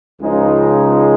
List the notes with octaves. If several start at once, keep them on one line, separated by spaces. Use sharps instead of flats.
C#2 C#3 F3 G#3 D#4